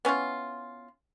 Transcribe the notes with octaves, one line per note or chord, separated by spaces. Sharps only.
B3 C#4 E4 F4